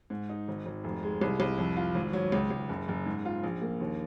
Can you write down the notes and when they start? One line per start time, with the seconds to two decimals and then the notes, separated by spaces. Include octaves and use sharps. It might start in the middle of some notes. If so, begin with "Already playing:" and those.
0.10 G#2
0.29 D#4
0.48 G#1
0.66 G#1
0.84 F1
1.03 G#3
1.21 C2
1.40 C2
1.58 F2
1.77 F4
1.95 G#1
2.13 F#3
2.32 C#2
2.50 C#2
2.69 F#1
2.88 F#1
3.06 G#2
3.25 F4
3.43 A#1
3.62 A#3
3.80 D#2